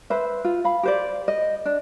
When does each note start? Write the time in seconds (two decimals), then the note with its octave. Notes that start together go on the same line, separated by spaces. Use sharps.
0.10 B4 C5 E5
0.45 F4
0.64 F5 B5
0.83 G4 C5 D5
1.28 D#5
1.65 D4